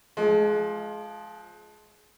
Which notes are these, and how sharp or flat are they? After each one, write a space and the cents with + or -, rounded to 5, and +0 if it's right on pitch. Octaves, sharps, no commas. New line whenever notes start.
F3 +0 G#3 +25